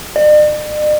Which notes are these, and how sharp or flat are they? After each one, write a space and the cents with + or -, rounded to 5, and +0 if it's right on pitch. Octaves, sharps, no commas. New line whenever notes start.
D5 +45